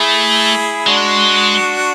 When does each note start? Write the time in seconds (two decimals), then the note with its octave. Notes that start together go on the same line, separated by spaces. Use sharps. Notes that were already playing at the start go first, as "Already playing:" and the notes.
Already playing: A3 E4 G#4
0.86 G#3 D4 F#4